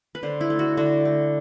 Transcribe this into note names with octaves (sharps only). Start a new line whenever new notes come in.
B4
D3 C5
E4
A3
F#4
D3 F#4
A3